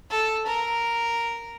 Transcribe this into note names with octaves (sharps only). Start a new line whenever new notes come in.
A4
A#4